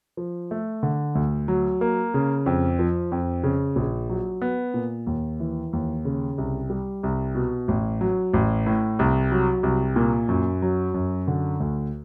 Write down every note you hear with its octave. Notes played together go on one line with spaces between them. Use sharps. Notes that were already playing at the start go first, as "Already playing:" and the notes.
F3
A3
D3
D2
F#3
A#3
C#3
F2
F3
F2
C#3
A#1
F#3
B3
A#2
D#2
E3
D#2
C#3
C2
G3
C2
B2
A1
F#3
A1
A2
C2
F#3
C2
A#2
F#2
F#3
F#2
D3
D2